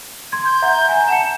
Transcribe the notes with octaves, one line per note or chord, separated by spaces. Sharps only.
C6 G#6
G6
E5 F#5 A#5
G#5 A#5
F#5 A5 C#7 E7